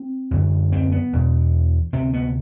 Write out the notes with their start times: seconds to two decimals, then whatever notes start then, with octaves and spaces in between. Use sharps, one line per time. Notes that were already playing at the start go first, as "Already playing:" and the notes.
Already playing: C4
0.31 F#2 D3
0.72 C4
0.92 B3
1.13 E2 B2
1.93 D2 C3 C4
2.13 B3